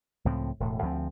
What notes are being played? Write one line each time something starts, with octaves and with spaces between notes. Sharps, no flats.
C#2 A2 F3 C4
E1 A2
D2 F3 F#3 C4